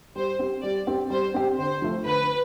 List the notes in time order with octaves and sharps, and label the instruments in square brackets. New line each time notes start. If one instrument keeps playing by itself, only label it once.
[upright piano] G3 [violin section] C5
[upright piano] C4 G4
[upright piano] G3 [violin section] D5
[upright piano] C4 G4
[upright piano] G3 [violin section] C5
[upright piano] C4 G4
[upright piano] D3 [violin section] C5
[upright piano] F3 A3
[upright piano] D3 [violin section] B4